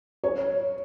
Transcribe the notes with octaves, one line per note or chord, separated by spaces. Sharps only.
C#5